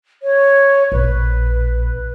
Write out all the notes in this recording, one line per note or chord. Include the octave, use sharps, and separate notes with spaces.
C#5
A#1 B4